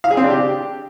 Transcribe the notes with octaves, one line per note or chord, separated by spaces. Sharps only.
F5
G#4
C4
D4
G4